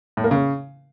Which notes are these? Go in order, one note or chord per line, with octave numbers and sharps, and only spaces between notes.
A2
A#3
C#3